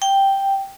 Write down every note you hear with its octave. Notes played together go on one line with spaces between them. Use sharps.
G5